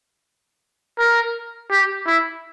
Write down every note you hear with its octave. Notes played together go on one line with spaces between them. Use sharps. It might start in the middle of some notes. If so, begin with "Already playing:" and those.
A#4
G4
E4